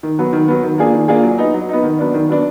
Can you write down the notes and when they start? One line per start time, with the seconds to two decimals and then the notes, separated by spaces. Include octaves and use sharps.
0.03 D#3
0.19 F#3 B3
0.33 D#3
0.48 F#3 B3
0.63 D#3
0.78 A#3 D4 F4 G#4
0.93 D#3
1.08 A#3 D4 F4 G#4
1.23 F#3
1.38 B3 D#4
1.54 F#3
1.69 B3 D#4
1.83 D#3
1.99 F#3 B3 D4
2.14 D#3
2.29 F#3 B3 D4